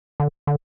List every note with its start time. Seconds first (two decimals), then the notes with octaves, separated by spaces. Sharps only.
0.20 D3
0.47 D3